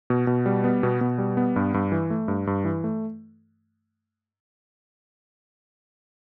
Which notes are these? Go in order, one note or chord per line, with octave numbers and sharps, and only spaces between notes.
B2
B2
G3
B3
B2
B2
G3
B3
G2
G2
E3
A3
G2
G2
E3
A3